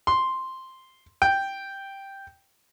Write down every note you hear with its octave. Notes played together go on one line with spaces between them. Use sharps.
C6
G5